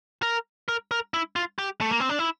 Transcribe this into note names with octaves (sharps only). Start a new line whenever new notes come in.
A#4
A#4
A#4
E4
F4
G4
A3
A#3
C4
D4
E4